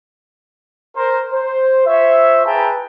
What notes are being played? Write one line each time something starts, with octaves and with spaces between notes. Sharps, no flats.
A#4 C5
C5
F4 C5 C#5 E5
E4 G#4 B4 G5 A5 A#5